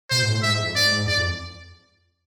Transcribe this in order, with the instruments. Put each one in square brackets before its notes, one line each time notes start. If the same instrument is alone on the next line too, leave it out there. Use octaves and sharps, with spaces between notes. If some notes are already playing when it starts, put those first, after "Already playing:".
[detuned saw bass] B2 [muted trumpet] C5
[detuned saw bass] G#2
A2
[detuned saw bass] G#2 [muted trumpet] E5
[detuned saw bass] F2
[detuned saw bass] G#2 [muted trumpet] D5
[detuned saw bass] G#2
[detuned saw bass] E2 [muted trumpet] D5
[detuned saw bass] F2